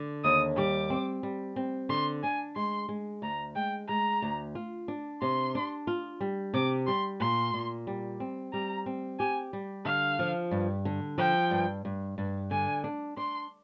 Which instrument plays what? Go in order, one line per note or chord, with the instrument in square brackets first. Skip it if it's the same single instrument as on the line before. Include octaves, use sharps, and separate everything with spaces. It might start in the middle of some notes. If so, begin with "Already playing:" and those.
Already playing: [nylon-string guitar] D3
[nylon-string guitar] D#2 [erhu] D#6
[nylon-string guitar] G3 [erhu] D6
[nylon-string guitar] C4
G3
C4
[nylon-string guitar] D3 [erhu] C6
[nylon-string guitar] D4 [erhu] G#5
[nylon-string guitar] G#3 [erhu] C6
[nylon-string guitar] G#3
[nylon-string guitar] D2 [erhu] A#5
[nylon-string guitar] G#3 [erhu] G5
[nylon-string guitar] G#3 [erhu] A#5
[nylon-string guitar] D2
F4
D4
[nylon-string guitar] C3 [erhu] C6
[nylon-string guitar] D4
F4
G3
[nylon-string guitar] C3 [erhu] D6
[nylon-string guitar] G3 [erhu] C6
[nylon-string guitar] A#2 [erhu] C6
[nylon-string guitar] A#2
G3
C4
[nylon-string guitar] G3 [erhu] A#5
[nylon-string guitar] C4
[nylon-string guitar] G4 [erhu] G#5
[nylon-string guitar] G3
[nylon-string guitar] D3 [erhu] F5
[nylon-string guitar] F3
G2
D3
[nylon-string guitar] F3 [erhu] G5
[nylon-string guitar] G2
G2
G2
[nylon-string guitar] D3 [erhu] G#5
[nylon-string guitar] D4
[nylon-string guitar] D4 [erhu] C6